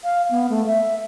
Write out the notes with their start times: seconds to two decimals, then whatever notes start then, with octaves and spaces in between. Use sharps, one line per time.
0.04 F5
0.31 B3
0.50 A3
0.66 E5